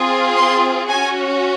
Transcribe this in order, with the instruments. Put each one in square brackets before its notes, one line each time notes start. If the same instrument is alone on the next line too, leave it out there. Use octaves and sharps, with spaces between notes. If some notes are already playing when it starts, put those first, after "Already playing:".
Already playing: [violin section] C4 F4 G#4
C6
C#4 F#4 G#5